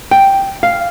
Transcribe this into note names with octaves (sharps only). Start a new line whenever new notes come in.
G5
F5